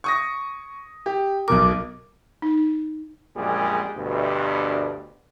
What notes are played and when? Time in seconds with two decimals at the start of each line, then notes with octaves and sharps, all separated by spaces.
0.04 C#6 D#6 A#6
1.06 G4
1.48 B1 B2 A#4 D6
2.42 D#4
3.36 A#1 F#2 A#2 G3 G#3 G#4
3.97 D2 G2 B2